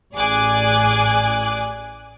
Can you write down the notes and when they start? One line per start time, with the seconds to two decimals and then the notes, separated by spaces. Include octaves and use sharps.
0.14 A1 G#4 D5 G#5 D6 F#6